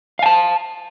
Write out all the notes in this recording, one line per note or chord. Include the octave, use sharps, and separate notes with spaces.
F5 G#5 A5